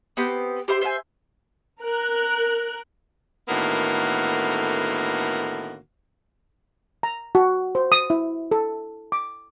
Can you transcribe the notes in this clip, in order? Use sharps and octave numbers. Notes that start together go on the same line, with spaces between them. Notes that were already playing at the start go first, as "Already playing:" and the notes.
B3 C4 G4
G4 C5 E5 C6
C5 E5 F5 G#5
A#4 F#6
A2 D3 D#3 A#3 B3 F#4
A#5
F#4
C5
D#6
E4
A4
D6